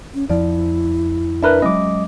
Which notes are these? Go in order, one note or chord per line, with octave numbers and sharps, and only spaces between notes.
C#4
F2 F3 E4 D5
D4 A#4 B4 E5 B5 F#6
F#3 G#3 C#4 D#5 D6